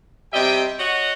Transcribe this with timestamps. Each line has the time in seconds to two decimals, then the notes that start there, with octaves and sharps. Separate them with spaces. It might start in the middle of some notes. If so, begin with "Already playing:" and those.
0.33 C3 G3 D#5 E5 G5
0.79 F#4 C#5 D#5 F#5